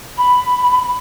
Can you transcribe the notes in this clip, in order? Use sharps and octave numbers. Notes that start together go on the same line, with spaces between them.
B5